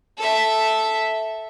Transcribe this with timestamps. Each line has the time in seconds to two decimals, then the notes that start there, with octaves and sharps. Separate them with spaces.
0.18 A4 E5